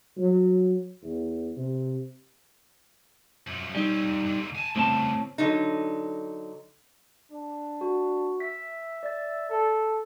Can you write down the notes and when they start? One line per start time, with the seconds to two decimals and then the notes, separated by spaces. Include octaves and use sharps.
0.17 F#3
1.03 E2
1.57 C3
3.47 F#2 F3
3.75 G3 C4 C#4 D#4
4.03 F2 G#2
4.25 G#2 D3
4.55 G#5 A5
4.76 A2 C#3 G3 C4 A5
5.38 D3 F#3 D#4
7.32 D4
7.81 F#4
8.40 E5 B6
9.03 D5 A6
9.50 A4